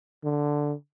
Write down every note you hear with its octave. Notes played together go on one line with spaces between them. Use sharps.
D3